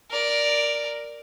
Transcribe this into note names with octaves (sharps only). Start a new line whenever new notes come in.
A#4 D5